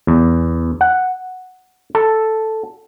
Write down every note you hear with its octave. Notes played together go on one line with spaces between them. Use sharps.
E2
F#5
A4